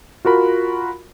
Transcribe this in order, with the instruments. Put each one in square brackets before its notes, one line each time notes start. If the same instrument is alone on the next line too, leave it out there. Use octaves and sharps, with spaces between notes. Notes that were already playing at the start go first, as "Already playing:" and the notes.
[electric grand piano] F4 F#4 A#4 B5